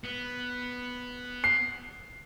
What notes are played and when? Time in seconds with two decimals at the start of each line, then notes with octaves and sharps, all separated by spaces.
0.04 B3
1.44 C7